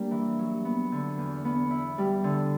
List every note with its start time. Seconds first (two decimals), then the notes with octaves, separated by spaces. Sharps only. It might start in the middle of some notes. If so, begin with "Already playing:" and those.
Already playing: G3 A#3 D4
0.11 E3
0.39 F#3
0.65 B3
0.92 D3
1.18 E2
1.45 B3
1.71 E4
1.98 G3
2.24 D3